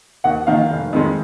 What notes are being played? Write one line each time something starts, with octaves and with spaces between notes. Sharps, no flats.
D#2 F#5
D#3 A#3 F5
F1
F2 D#3 G#3